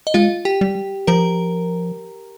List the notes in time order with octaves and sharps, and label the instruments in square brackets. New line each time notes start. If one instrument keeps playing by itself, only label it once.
[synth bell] D#5
[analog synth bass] G#3 [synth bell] F4 F5
[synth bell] G4 G5
[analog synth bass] G3
[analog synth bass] F3 [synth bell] A#4 A#5